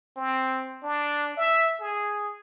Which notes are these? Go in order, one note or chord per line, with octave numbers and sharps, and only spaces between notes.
C4
D4
E5
G#4